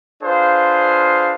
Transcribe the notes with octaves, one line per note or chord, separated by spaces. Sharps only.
D4 F4 G#4 B4 C5 F5